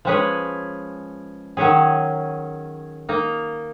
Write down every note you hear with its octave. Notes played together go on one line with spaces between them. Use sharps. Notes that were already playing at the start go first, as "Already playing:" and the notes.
F3 G#3 C#4 G#4 B4
D#3 F#3 C#4 G#4
A#3 D#4 A#4